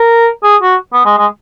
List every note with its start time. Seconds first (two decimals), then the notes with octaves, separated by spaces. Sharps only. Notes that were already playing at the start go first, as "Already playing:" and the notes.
Already playing: A#4
0.43 G#4
0.62 F#4
0.93 B3
1.05 G#3
1.18 G#3